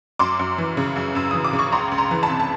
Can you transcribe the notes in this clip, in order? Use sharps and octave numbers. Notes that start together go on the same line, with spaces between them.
F#2 C6 D6
F#2
E3
C#3
F#2
F#2 E6
E3 D#6
D6
C#3
C#6
C#2 A#5 C6
C#2
A#5 C6
E3
A5 B5
C3
A5